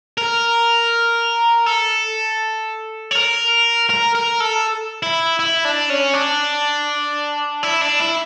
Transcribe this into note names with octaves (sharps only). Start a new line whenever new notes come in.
A#4
A4
C#5
A#4
A#4
A#4
A4
E4
E4
D4
C#4
D4
E4
D4
E4